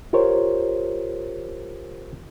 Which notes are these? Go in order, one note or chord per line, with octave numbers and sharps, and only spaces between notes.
F4 G4 A#4 C5 C#5